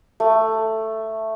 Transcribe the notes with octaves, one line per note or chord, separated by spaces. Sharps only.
A3